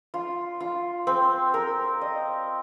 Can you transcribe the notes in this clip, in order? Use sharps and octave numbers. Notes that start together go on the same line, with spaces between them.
F4
F4
C4
A#4
D#5